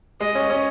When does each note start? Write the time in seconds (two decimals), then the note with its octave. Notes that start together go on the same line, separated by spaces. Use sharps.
0.20 G#3 D#5
0.35 C#4
0.50 C#4